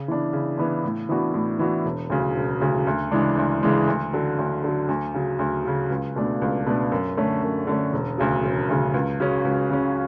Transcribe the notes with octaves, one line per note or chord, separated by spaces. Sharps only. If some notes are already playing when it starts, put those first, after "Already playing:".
Already playing: C#3
E3 B3 D4
C#3
E3 B3 D4
A2
E3 B3 D4 F#4
A2
E3 B3 D4 F#4
E1
D2 C#3 F#3
E1
D2 C#3 F#3
D2
C#3 E3 G#3 D4
D2
C#3 E3 G#3 D4
D2
D3 F#3
D2
D3 F#3
D2
C#3 F#3
D2
C#3 F#3
C#2
B2 A3 D4
C#2
B2 A3 D4
F#2
D3 A3 C#4
F#2
D3 A3 C#4
E1
D2 C#3 F#3
E1
D2 C#3 F#3
C#2
C#3 F#3 C#4
C#2
C#3 F#3 C#4